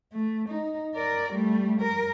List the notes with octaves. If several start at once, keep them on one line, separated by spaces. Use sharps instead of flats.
A3
D#4
A#4 D5
G3 A3
A#4